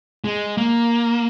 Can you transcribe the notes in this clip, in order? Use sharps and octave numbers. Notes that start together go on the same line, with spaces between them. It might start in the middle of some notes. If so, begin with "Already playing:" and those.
G#3
A#3